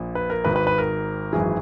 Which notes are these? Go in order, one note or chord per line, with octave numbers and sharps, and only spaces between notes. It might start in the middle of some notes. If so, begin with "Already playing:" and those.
Already playing: A#1 A#2
B4
A#4
G#1 G#2 D#3 B4
B4
B4
A#4
G#1 F#2 E3 G#4